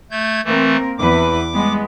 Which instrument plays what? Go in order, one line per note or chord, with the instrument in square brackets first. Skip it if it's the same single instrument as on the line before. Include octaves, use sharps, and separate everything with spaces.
[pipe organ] A3 G6 G#6
[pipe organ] E3 A3 [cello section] A#3 C4 A#4
[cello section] E2 E3 B4 [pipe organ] D6
[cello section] G3 G#3 B3